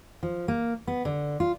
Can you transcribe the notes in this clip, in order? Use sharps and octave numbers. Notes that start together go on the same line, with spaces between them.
F3
A#3
B3
D3
F4